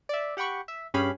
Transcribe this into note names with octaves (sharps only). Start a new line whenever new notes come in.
D5 E5
G4 F#5 G5 B5 C#6
E5
G2 C#4 G4 G#4 F5 B5